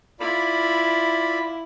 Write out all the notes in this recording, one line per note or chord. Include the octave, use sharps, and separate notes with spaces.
E4 F4 D5 B5